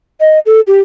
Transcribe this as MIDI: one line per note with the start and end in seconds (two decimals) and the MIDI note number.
0.20 0.39 75
0.46 0.60 69
0.67 0.80 67